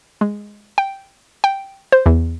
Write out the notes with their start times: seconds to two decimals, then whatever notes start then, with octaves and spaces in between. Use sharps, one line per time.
0.21 G#3
0.78 G5
1.44 G5
1.92 C5
2.06 E2